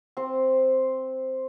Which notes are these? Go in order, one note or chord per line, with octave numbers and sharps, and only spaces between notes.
C4 C5